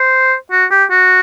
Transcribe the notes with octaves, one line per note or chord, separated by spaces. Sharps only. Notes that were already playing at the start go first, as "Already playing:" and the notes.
Already playing: C5
F#4
G4
F#4